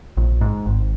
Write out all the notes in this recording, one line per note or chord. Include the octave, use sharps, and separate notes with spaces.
A#1
G#2
G#1